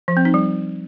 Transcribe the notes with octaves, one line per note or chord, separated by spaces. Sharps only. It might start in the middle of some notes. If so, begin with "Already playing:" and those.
F3
C4
D#4
G3